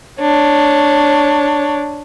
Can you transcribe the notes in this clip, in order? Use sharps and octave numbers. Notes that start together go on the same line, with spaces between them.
D4 C#5